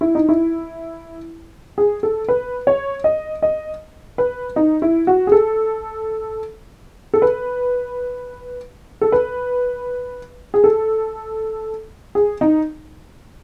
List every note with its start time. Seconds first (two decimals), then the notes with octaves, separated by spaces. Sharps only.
0.01 E4
0.15 D#4
0.29 E4
1.78 G#4
2.03 A4
2.28 B4
2.67 C#5
3.04 D#5
3.42 D#5
4.18 B4
4.56 D#4
4.82 E4
5.07 F#4
5.27 G#4
5.32 A4
7.14 A4
7.22 B4
9.01 A4
9.12 B4
10.54 G#4
10.64 A4
12.15 G#4
12.41 D#4